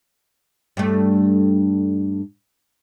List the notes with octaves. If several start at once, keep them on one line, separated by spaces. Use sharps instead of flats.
G2 A3